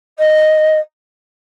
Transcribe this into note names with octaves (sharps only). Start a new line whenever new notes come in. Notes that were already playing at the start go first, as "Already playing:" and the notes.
D#5